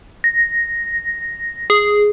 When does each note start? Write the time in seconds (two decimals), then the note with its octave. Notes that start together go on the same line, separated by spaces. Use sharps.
0.24 A#6
1.70 G#4